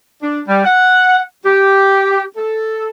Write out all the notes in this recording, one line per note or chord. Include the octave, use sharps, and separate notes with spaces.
D4
G3
F#5
G4
A4